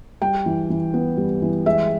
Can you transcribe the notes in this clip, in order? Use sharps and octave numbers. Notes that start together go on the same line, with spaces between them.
G3 G5
E3
E3
B3
G3
E3
G#3 E5